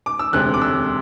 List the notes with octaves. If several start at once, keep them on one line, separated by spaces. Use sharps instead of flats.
D6
E6
E1 D2 C3 F#6
D6
E6